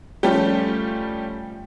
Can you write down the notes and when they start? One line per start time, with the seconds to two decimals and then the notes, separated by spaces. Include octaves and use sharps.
0.23 F3 G3 A3 C#4 G4